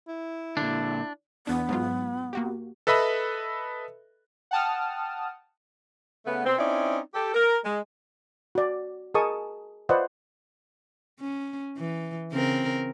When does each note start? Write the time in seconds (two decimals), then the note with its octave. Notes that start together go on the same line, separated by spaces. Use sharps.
0.08 E4
0.57 A#2 D3 D4
1.47 E2 B3 D4
1.69 G#2 F#3 F4
2.33 A#3 F#4 G4
2.87 A4 B4 D#5 E5 B5
4.51 F#5 G5 A5 D#6 F6
6.26 C#3 A3 B3
6.46 B2 C4
6.58 C4 C#4 D#4 E4 D5
7.14 G4 A4
7.34 A#4
7.65 G#3
8.55 F#4 D5
9.14 G#4 A#4 D#5 A5 C#6 D#6
9.89 F4 B4 C5 D5 D#5 F#5
11.20 C#4
11.77 E3
12.32 C#3 C4 A#4